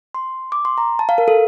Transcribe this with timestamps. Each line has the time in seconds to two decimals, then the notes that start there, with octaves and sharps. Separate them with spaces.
0.15 C6
0.52 D6
0.65 C6
0.78 A#5
0.99 A5
1.09 F5
1.18 A#4
1.28 A4